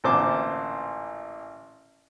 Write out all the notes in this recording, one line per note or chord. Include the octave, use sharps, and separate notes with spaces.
A1 A#2 D3 C5 A5 D6